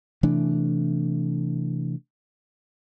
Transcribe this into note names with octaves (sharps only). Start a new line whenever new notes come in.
C3 E3 A3 D4